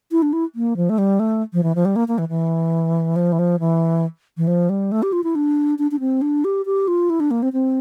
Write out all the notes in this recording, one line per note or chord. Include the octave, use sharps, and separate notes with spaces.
E4
D4
E4
A#3
F3
A3
G3
A3
F3
E3
F3
G3
A#3
A#3
E3
E3
F3
E3
F3
E3
E3
F3
G3
A3
G4
F4
E4
D4
D4
D4
C4
D4
G4
G4
F4
E4
D4
A#3
C4
C4